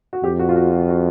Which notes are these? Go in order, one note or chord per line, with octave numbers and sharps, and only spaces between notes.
F#4
F2 G4
F#4
F4
F#4
F#4
F#4